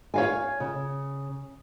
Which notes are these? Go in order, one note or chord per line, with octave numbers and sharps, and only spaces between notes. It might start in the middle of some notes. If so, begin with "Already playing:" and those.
C#5 F5 G#5
C#3